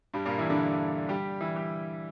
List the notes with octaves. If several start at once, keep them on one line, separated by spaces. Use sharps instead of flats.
G2 G3
A#2 A#3
E3 E4
D3 D4
G3 G4
E3 E4
G3 G4